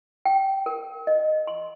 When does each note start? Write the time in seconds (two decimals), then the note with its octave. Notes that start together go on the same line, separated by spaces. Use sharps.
0.25 G5
0.66 A#4
1.07 D#5
1.47 C6